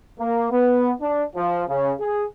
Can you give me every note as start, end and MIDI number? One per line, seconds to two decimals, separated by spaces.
0.20 0.52 58
0.52 0.92 59
1.02 1.24 62
1.35 1.64 53
1.69 1.94 49
2.00 2.25 68